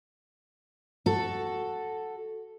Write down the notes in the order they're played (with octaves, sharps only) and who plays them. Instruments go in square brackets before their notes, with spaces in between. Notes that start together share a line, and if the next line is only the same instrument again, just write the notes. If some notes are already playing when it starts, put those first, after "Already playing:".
[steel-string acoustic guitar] F#4 A4